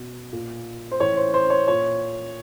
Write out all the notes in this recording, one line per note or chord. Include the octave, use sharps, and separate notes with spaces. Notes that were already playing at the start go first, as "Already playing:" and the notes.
Already playing: B2
A#2
C5
A2 E3 C#5
C5
C5
C#5
A#2 C#5